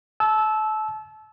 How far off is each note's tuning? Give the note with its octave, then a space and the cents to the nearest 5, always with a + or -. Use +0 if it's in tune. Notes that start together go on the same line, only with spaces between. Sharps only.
A5 -30 E6 -10